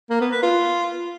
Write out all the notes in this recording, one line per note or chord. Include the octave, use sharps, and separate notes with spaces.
A#3
B3
B4
F4